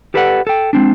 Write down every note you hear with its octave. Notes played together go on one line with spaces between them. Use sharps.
G4 A4 B4 D5 F5 F#5
A4 G5
G#3 C4 D4